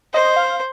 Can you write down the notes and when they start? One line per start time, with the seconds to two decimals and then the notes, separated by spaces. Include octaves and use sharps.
0.14 C5 D#5
0.37 F5